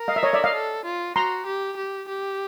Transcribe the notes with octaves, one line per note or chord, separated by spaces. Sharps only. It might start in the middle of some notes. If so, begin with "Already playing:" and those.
Already playing: A#4
D#5 F5
E5
C#5 D#5
D5 E5
D#5 F5
A4
F4
F#4 A#5 C6
G4
G4
G4